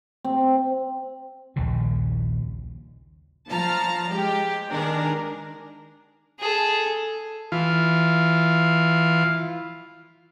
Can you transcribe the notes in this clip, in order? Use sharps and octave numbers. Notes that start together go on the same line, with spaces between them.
C4
A#1 D#2 C#3
F3 A5 A#5 F6
G#3 G4
D#3 D4 G#4 A#4
G#4 A4
E3 F4